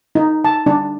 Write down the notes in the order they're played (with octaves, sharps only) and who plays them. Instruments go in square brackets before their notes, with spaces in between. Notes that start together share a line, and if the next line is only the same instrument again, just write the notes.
[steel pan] D#4
A5
D4